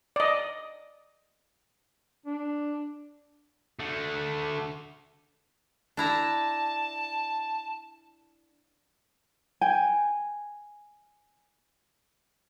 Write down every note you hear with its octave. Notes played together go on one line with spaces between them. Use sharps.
D5 D#5
D4
D3 A3
D4 E4 A5 A#5
G5 G#5